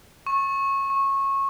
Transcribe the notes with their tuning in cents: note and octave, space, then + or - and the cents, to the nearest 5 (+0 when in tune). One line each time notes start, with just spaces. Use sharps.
C#6 -20
C#6 -20